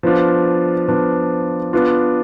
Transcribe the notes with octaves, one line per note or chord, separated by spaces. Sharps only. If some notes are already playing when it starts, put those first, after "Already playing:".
F3 B3 D4 F4
F3 B3 D4 F4
B3 D4 F4